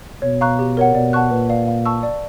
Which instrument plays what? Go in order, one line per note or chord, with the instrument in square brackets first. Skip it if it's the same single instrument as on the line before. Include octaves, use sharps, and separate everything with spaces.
[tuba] B2 [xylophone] C#5
[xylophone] F5 A#5 C#6 F#6
G4
A#4 C#5 F#5
[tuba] B2 [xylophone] D5
[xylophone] F#5 A5 C#6 F#6
[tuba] A#2 [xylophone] B4
[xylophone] D5 F5
F5
A5 C#6 E6
D5